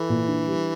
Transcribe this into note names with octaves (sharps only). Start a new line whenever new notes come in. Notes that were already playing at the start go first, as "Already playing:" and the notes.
Already playing: E3 A4
A#2
D4
G3